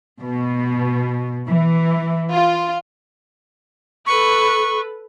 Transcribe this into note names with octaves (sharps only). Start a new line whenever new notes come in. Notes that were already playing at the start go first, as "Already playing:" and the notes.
B2
E3
F4
A4 B4 C#6